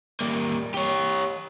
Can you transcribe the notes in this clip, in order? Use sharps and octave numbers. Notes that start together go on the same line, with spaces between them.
G3 A#3
G4 C#5